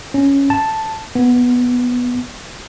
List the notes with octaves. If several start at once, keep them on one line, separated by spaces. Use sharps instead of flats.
C#4
A5
B3